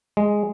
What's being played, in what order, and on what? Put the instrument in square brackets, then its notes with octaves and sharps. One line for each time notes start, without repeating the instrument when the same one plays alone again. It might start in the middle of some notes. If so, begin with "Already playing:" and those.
[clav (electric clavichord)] G#3